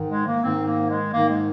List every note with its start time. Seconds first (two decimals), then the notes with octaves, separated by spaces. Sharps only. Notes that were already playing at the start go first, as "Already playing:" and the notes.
Already playing: G#2 D#3
0.09 G#3
0.26 A#3
0.43 G#2 D#3 C4
0.66 A#3
0.89 G#3
1.12 G#2 D#3 A#3
1.29 G#3